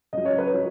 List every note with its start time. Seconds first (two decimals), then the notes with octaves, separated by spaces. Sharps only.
0.13 C#3 F#3 D#5
0.25 C#5
0.38 B4
0.50 F#3 C#5